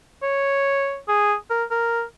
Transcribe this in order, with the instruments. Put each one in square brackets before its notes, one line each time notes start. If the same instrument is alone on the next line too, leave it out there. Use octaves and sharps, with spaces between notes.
[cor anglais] C#5
G#4
A#4
A#4